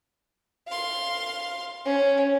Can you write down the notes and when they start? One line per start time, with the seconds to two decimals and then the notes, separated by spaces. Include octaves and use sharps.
0.68 F5 C6
1.85 C#4